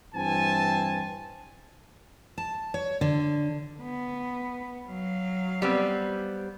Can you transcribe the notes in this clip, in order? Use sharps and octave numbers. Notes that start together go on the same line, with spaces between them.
G2 E3 C4 G#5 A5
A5
C#5
D3
B3
F#3 F5
G3 B3 C4